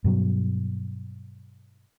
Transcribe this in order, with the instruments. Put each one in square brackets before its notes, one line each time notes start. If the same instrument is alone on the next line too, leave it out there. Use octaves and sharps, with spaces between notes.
[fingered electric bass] G2 B2 F#3